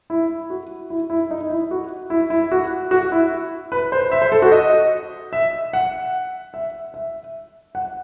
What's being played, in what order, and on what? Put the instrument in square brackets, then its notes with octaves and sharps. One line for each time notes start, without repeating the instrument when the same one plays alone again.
[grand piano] E4
F#4
E4
E4
D#4
E4
F#4
E4
E4
F#4
F#4
E4
B4
C5
E5
C5
A4
F#4
D#5
E5
F#5
E5
E5
F#5